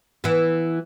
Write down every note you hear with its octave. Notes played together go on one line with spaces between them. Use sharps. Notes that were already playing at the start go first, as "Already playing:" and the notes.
E3 B3